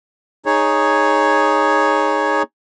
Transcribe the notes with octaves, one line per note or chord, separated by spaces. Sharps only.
D#4 G#4 C#5